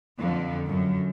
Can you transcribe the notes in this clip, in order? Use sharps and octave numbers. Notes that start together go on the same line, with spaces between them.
F2 D3
F#2